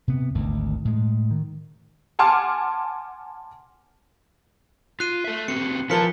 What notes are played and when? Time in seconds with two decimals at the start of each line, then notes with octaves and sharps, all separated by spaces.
0.08 C3 B3
0.35 G#1 D2 D#3
0.85 A2 G#3
1.31 D#3
2.19 F#5 G#5 A5 C6 D6 F6
5.00 F4 F#6 C7 D#7
5.24 A4 E5
5.48 C4 F#4 G4 C#7
5.90 F3 E4 A#4 B4 A5 B6 C#7 G7